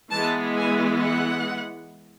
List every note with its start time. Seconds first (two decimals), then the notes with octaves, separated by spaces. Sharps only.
0.12 E3 G#3 B3 A5
0.57 G#5
1.02 F#5